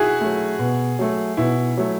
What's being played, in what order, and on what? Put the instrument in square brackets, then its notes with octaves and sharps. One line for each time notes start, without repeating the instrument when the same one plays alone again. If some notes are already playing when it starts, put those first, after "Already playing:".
Already playing: [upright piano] E4 F#4 G#4
[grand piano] F#3 A3
B2
F#3 A3
[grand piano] B2 [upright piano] E4
[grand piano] F#3 A3